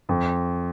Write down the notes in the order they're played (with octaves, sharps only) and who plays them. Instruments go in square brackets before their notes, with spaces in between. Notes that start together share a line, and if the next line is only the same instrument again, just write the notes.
[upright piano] F2